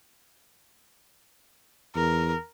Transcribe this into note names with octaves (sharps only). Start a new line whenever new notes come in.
E2 A#4